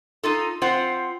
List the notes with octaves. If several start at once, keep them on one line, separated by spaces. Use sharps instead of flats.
D#4 F4 A4
C4 F4 C5 F#5